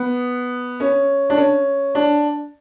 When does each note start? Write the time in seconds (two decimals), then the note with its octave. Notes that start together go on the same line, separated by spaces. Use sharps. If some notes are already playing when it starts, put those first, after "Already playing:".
Already playing: B3
0.80 C#4
1.30 D4
1.37 C#4
1.95 D4